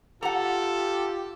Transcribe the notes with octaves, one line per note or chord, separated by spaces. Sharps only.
F4 G4 A4 F#5 A#5